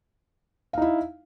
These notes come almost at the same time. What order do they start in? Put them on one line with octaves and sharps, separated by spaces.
F5 D#4 E4